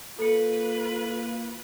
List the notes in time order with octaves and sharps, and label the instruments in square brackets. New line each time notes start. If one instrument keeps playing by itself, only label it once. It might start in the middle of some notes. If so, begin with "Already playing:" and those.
[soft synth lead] A#3 [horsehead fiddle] F4 [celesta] A4 C#7 [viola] B4